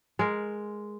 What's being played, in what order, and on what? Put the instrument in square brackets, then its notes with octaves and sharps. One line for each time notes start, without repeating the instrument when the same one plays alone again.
[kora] G#3 A#4